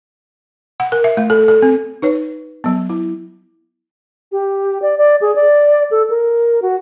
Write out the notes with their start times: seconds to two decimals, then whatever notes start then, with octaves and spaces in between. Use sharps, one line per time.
0.80 F#5
0.92 A#4
1.04 E5
1.17 A3
1.30 A4
1.48 A4
1.62 C4
2.02 D#4 B4 C#5
2.64 F#3 B3
2.90 E4
4.32 G4
4.82 D5
4.98 D5
5.21 G#4
5.35 D5
5.91 A4
6.10 A#4
6.62 F#4